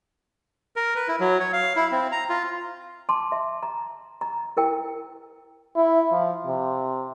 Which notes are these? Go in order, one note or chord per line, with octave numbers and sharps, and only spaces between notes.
A#4
B4
E4
F#3
C#5
F5
E4
C4
A#5
F4
A5 C6 D6
E5
A#5
A#5
E4 A#4 G5
E4
F3
C3